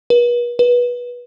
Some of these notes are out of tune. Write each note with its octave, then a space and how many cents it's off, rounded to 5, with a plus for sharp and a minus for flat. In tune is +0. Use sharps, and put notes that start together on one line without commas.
B4 -40
B4 -20